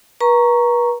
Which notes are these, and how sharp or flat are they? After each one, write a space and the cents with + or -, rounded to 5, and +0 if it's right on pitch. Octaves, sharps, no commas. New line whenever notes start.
B4 -40 A#5 +0 C#6 +0